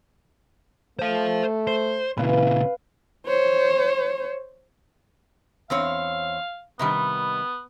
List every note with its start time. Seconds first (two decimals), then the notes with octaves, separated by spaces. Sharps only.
0.99 A3 C5 F5
1.67 C5
2.17 A#2 C#3 E3 B4 F5
3.27 C5 C#5
5.70 E2 C4 C#5 F5
6.79 C3 D#3 G3 B3